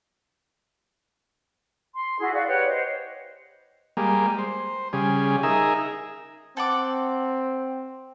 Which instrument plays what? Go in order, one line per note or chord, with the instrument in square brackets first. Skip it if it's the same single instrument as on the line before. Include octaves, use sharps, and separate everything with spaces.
[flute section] C6
E4 F#4 G#4
F#4 D5 F5
G4 B4 C#5 F#5
C5 D#5
[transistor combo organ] G3 G#3 A#3
C5
C#3 G3 G#4
D#4 G#4 A#4 E5
[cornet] C4 [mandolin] A4 F#5 D6